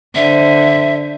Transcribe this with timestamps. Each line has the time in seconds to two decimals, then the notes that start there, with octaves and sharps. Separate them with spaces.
0.15 D3 C5 E5